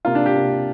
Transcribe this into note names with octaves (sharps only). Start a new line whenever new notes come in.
C3 A#3 F4
D4
G4
C3 A#3